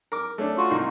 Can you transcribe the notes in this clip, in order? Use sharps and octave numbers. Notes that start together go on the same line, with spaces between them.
A#4 D6
A3 C#4 D4
F4 F#4
C2 A#3 D#4